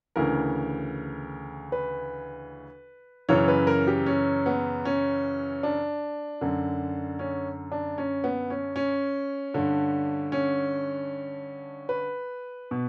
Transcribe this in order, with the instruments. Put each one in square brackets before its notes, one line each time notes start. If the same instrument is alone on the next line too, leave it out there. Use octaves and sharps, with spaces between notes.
[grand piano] D2 C#3 E3 A#4
B4
F#2 C#3 E3 C#5
B4
A#4
G4
C#4
B3
C#4
D4
F#2 D3
C#4
D4
C#4
B3
C#4
C#4
G2 D3
C#4
B4
B2